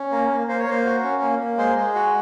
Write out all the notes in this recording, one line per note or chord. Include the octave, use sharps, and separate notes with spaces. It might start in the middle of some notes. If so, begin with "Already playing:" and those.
Already playing: C#4
A#3
A#3
A#3 C5
C#5
A#3 C5
F#4
C#4
A#3
A#3
G#3 C5
G#3
F#4